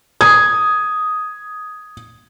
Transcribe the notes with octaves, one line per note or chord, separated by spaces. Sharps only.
D#6 G#6